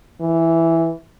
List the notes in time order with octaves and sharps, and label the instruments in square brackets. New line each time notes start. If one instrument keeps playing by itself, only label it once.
[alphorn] E3